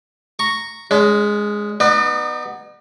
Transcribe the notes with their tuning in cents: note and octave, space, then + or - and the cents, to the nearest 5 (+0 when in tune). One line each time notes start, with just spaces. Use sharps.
A#5 -5 C#6 +0
G#3 +0 C#4 +40
B3 +0 D#4 +0 D5 +45